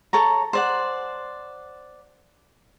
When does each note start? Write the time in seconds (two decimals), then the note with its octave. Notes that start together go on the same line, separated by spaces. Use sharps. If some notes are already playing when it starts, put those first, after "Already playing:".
0.13 A4 C#5 A#5
0.53 C5 D5 F#5